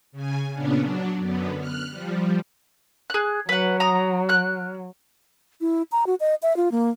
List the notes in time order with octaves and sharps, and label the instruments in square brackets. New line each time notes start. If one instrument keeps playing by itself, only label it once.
[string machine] C#3 G#5
A#2 C#3 B3 C#4 D4
F#3 D4
F#2 D3 B3
F6 F#6
F3 G3
[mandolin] G#4 F#6
[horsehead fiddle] F#3 [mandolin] B4 F#5
[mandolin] A#5 D#6
F6 F#6
[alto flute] E4
A#5
F#4
D#5
E5
F4
A#3